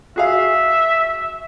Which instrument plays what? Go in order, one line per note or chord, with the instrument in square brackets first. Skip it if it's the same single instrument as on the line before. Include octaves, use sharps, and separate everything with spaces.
[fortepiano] F#4 G#4 F5 [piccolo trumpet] E5